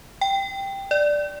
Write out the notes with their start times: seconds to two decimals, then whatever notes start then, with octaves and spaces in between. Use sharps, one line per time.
0.21 G5
0.91 D5